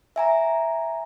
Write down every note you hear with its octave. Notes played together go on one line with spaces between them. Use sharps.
E5 G#5 A#5